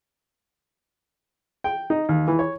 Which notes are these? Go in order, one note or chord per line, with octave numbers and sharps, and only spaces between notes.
G5
D#4
D#2
E3
C#5